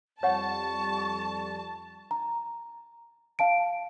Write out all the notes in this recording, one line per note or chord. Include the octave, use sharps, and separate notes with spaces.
F2 G3 C#5 F#5 A5 C#6
A#5
F5 A5 D7